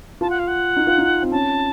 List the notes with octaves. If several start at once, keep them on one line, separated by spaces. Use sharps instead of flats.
F4 A5
F#5
F5
F#5
D#4
F4
D#4
C4
C#4 A5